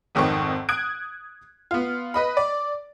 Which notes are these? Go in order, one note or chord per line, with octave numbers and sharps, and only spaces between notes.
G#1 F2 D#3 C4 C#6
D#6 F#6 G#6 D7
B3 F4
B4 D#5 B5
D5